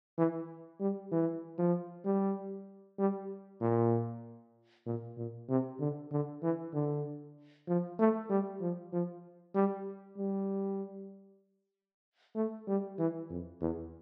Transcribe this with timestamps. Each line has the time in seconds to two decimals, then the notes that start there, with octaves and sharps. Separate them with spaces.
0.18 E3
0.80 G3
1.12 E3
1.59 F3
2.06 G3
2.99 G3
3.62 A#2
4.86 A#2
5.18 A#2
5.49 C3
5.80 D3
6.12 D3
6.43 E3
6.74 D3
7.68 F3
7.99 A3
8.30 G3
8.61 F3
8.93 F3
9.55 G3
10.18 G3
12.36 A3
12.68 G3
12.99 E3
13.30 F2
13.61 E2